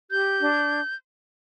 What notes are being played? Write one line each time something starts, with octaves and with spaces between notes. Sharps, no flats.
G4 G6
D4